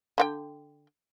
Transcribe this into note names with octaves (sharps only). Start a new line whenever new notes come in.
D3 F#4 G5